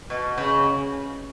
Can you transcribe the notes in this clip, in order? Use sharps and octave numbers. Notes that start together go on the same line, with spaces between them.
B2
C#3